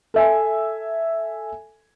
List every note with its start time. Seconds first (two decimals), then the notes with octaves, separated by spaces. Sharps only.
0.14 A4 E5 G#5